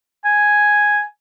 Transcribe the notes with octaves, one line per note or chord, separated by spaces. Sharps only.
G#5